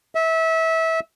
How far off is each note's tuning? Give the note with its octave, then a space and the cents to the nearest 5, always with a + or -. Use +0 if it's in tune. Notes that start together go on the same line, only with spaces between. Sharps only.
E5 -25